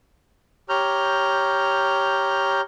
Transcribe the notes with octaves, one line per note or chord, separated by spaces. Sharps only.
G4 C#5 A#5 F6 G6